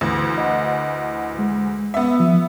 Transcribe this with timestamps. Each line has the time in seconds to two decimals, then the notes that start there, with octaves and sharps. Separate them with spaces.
0.01 D2 E3
0.38 D#5 F#5
1.39 G#3
1.94 B3 E5
2.20 F3